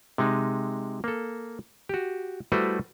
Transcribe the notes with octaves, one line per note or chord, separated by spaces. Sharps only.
C3 G#3 D#4
A#3 A4
F#4 G4
G3 A3 E4 F#4 B4 C5